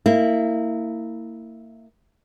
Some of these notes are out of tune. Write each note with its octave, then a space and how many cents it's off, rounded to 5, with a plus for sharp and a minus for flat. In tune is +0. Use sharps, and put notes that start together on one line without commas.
A#3 -30 E4 -15